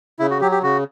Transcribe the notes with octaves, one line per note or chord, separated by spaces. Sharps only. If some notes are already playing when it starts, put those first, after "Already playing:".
C#3 E4
F#4
F#3 G4
G4
C#3 F#4